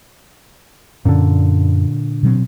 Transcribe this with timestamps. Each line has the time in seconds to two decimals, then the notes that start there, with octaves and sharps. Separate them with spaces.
1.05 F#2 A#2 D3 C#4
2.23 B2 F#3 C4